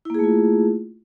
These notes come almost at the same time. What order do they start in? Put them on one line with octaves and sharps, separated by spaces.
E4 A#3 G#4 A3 F4